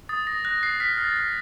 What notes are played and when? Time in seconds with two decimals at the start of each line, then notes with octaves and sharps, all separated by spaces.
0.09 D#6 A6
0.27 D#6 A#6
0.45 F#6 A#6
0.63 F#6 C7
0.80 F6 B6
0.98 F6
1.04 A6
1.16 F6